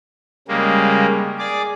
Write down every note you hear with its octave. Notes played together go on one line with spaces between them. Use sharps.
C#3 G3 G#3 A#3
G#4 D5 D6